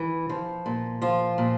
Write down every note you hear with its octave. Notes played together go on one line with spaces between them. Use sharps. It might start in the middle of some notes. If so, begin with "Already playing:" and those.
Already playing: E3
F3
A#2
F3 F4
A#2